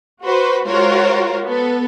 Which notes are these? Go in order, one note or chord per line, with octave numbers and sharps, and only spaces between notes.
F#4 B4 C5
G#3 F4 F#4 A#4 C5 C#5
B3 A4